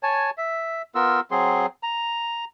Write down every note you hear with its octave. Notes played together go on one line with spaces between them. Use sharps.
C#5 G#5 A5
E5
B3 F4 A#4 E6
F#3 C4 G#4 C6
A#5